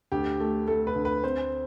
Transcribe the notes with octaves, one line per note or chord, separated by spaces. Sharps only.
D2 G4
A3
A3 A4
B4
D2
B4
C4 C5